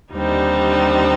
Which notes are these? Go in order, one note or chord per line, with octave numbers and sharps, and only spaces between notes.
D#2 D3 G3 C4 D#4